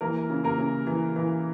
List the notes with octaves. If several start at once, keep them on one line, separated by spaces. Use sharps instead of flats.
E3 A#3 A#4
C#3
A#3 A#4
C#3
E3
E3